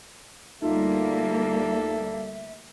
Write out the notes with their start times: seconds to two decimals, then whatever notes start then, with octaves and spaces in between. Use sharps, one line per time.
0.62 D2 G3 A#3 D#4 F4 A4 E5